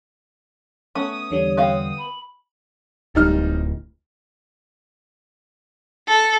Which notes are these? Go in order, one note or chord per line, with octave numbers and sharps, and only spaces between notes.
A3 B3 C#4 D#6
E2 D3 G3 C#5
B3 C4 F5
B5
D1 G3 D#4 F6
A4